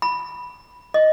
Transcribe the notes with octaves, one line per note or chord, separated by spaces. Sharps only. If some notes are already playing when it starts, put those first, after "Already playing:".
B5
D#5